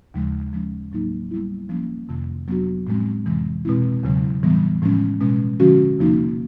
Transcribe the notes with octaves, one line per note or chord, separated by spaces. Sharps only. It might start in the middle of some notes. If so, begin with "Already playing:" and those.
D#2 C#3 F3 G#3
F3 G#3 C#4
A2 F#3 A#3 D#4
G3 B3 E4
F3 A#3 C#4
F2 C3 D#3
F#3 B3 D4 F#4
A2 F3 G#3 C4
F2 C3 E3 G#3
B2 G#3 C4 E4
E2 C#3 F#3
A2 E3 G3 B3
A2 F3 G#3 C#4
B2 G#3 C#4
D3 F3 G#3 C#4 F#4
E2 C3 F3 A#3 D#4